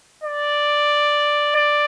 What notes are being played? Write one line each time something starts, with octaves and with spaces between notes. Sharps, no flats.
D5
D5